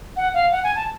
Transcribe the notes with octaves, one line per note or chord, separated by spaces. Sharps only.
F#5
F5
F#5
G#5
A5